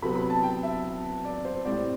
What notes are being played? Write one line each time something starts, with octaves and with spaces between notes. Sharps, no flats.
C3 F#3 B3 B5
B5
A5
G5
E5
D5
C5
A2 G3 C4 D5